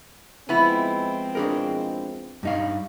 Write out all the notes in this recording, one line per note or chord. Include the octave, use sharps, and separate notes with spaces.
F3 G#3 B3 C4 E4 G#5 B5
D4 G#4 A#4
G2 D#4 F5